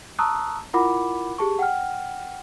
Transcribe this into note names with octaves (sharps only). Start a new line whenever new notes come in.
A5 A#5 C#6 D#6 E6 F#6
E4 F4 A#4 F#5 B5 D6
G4 G#4 A5 C#6
F#5 G5 F6